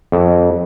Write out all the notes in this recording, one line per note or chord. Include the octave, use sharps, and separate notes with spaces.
F2